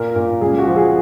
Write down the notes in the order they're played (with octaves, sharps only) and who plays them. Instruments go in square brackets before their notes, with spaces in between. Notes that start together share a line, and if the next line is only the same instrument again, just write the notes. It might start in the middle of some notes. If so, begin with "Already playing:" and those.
Already playing: [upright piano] A#2 A#4
A#2
C#2 G#4
F#4
F3
G#4